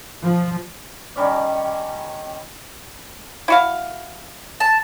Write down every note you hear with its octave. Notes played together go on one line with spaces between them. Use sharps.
F3
D#3 G3 C#4 D5
E4 F#4 F5
A5